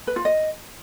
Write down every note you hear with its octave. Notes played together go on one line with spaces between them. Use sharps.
B4
F4
D#5